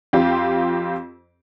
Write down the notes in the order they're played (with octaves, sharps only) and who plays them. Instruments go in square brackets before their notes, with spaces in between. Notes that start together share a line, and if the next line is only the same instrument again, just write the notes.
[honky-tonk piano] F2 C4 F4 G4